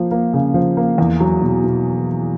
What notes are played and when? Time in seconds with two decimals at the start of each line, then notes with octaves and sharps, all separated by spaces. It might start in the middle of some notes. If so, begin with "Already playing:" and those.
Already playing: F3 A#3
0.11 A#3
0.33 C#3
0.54 F3
0.77 A#3
0.98 E2
1.20 F#3
1.42 B2
1.64 B2